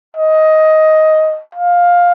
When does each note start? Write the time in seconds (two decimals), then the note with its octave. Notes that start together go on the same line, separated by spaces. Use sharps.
0.17 D#5
1.55 F5